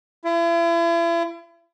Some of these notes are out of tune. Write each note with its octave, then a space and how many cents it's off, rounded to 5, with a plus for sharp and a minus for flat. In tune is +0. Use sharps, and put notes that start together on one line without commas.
E4 +40